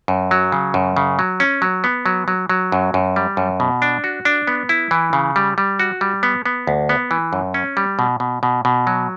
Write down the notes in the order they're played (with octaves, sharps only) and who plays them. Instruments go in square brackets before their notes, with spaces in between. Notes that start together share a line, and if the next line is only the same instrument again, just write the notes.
[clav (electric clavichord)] F#2
F#3
C#3
F#2
C#3
F#3
C#4
F#3
B3
F#3
F#3
F#3
F#2
F#2
G3
F#2
B2
D4
F#4
D4
B3
E4
E3
C#3
G3
G3
F#4
G3
B3
B3
D2
B3
E3
F#2
C#4
G3
B2
B2
B2
B2
F#3